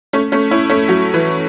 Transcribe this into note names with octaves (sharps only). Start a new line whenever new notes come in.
A3 C#4
A3 C#4
C#4 E4
A3 C#4
F#3
E3